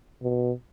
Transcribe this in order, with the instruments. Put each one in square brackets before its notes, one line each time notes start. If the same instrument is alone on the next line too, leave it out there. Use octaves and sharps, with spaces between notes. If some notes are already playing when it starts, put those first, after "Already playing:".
[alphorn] B2